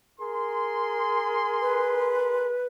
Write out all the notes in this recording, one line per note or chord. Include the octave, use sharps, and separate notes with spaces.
G#4 A#4 C6
B4